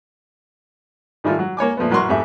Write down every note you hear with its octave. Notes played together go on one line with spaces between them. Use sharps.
G#2 D#3 G3 A3 E4 F4
F#3
A#3 C#5 G#5 D6
A#2 F3 A3 B3
A1 F#3 A#4 C6 C#6
F2 G#2 A3 G4 E5